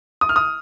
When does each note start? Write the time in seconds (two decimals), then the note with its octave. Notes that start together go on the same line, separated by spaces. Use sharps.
0.21 D#6
0.29 F6
0.36 D#6